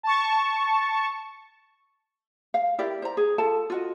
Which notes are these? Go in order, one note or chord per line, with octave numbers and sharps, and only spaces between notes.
A5 C#6
F5
E4 G4 A#4 D5
C5 A#5
G#4
F4 A4 A5
F4 F#4 D#5